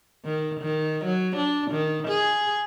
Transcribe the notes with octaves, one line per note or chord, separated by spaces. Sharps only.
D#3
D#3
F#3
D4
D#3
G#4